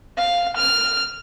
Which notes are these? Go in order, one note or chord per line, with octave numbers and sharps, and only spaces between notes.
F5
F6